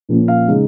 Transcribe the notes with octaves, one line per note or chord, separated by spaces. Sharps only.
A#2 F3 A#3 C#4
F5
C#3 G#3 D#4